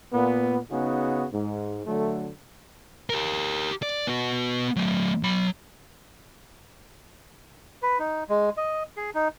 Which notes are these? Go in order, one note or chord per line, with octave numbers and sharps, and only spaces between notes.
A#2 B3
C#3 B3 D#4 F#4 G#4
G#2
D3 F#3 A3
G4 A#4
D5
B3 F#4
F#3 A3
F#3 B5
B4
D#4
G#3
D#5
G#4
D#4